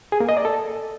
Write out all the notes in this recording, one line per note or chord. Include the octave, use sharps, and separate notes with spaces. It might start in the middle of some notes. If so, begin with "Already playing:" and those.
G#4
A#3
D#5
D5
A4